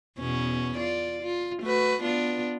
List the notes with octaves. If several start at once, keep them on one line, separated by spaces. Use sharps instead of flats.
E2 B2 C#4
F4 D5
F4
A3 F#4 B4
B3 D4 F4